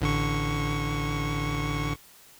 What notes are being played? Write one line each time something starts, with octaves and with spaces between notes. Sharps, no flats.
A1 D3 C#6